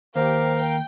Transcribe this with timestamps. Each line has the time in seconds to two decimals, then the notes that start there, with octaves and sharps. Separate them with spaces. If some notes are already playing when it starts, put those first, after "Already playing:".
0.16 D#2 G4 A#4 C5 F5
0.57 G5